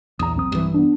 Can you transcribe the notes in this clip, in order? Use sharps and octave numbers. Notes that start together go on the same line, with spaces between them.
A#1 E2 A#5 D#6
B1 C4 D#6
G2 E3
B3 D4